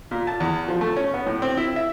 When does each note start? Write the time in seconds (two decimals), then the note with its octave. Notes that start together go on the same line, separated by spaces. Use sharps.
0.11 A#2
0.27 A5
0.40 E2
0.68 F3
0.81 A3
0.96 C#4
1.14 B3
1.26 A2
1.42 C4
1.57 E4
1.76 E5